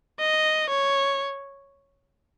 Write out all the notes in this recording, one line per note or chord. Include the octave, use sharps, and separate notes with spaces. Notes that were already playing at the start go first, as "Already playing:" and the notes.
D#5
C#5